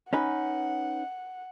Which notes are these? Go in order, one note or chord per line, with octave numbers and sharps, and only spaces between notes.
C#4 D#4 B4 F#5